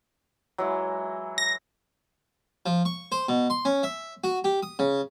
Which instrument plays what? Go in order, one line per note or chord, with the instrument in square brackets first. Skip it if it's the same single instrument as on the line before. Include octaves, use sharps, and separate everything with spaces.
[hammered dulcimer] E3 G#3 E4 [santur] F#3
[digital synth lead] A#6
[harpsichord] F3
C#6
C5
B2
C6
C#4
E5
F#4
G4
D#6
C#3